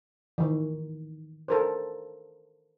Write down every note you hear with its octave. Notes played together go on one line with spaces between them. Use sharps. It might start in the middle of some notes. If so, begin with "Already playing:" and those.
D#3 E3
A4 A#4 C5